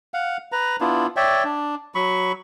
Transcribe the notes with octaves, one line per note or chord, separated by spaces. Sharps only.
F5 F#5
B4 A#5
B3 D4 E4 F4
C#5 D5 E5 G5
D4
F#3 B5 C#6